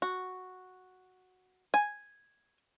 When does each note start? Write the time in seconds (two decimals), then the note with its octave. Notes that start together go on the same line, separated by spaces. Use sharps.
0.02 F#4
1.74 G#5